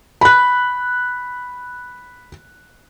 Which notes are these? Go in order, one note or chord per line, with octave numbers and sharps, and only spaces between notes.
B5 F#6